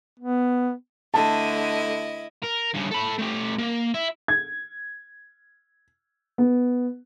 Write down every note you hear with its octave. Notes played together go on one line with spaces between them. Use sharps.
B3
D3 A3 E4 D#5 A5
A#4
G2 C#3
A4 B5
A3 G4
A#3
E4
G#6
B3